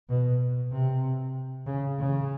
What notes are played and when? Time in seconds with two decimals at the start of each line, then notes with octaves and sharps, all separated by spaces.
0.09 B2
0.72 C3
1.67 C#3
1.99 C#3